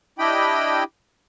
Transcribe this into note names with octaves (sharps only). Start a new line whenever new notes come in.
D4 E4 G4 D#5 G5 B5